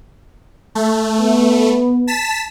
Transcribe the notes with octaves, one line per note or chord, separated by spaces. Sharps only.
A3
B3
A5 B6 E7